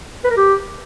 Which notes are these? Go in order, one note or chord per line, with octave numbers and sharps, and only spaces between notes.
B4
A#4
G4